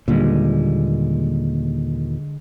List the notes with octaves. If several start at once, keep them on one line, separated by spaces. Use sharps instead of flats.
D#2 A#2 D3 G3 G#3